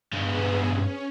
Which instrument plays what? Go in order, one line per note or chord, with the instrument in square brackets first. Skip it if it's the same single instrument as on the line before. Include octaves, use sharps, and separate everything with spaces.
[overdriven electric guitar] G2 G#3 [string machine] B3 G#4
[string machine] C#4